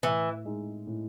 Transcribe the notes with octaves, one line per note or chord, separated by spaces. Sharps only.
A2 E3
G#3 D#4
A2